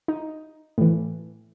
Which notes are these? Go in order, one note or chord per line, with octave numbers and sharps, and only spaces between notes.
D#4
A2 E3